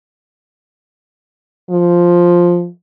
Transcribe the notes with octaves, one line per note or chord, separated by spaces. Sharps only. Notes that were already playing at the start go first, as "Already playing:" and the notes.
F3